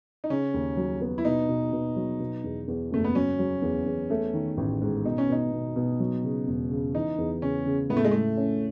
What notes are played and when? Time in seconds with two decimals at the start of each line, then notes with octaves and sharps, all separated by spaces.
0.24 D#4
0.30 C#3 C#4
0.54 D#2
0.77 F#3
1.01 B3
1.18 E4
1.25 B2 D#4
1.49 B2
1.73 B2
1.96 F#3
2.20 B2
2.44 E2
2.68 E2
2.91 F#1 A3
3.04 B3
3.15 F#3 C#4
3.39 F#3
3.62 E2
3.86 E2
4.10 A3
4.34 D#3
4.57 A1
4.81 G#2
5.05 B2 D#4
5.18 C#4
5.29 B2 D#4
5.52 B2
5.76 B2
6.00 F#3
6.24 C#3
6.47 E1
6.71 C#3
6.94 E3 D#4
7.18 E2
7.42 C#3 C#4
7.66 C#3
7.90 A2 B3
7.97 A3
8.05 G#3
8.11 A2 A3
8.37 C#4